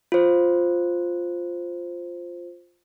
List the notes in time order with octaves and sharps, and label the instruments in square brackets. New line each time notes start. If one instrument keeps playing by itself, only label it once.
[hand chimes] F4 C5